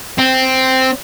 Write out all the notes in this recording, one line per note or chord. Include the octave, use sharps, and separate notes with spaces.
C4